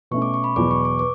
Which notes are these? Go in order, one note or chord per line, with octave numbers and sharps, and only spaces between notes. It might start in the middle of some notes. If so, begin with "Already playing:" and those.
B2 A3 C#4 C#6
D6
C#6
B5
E2 B2 F#3 D6
C#6
D6
B4 D6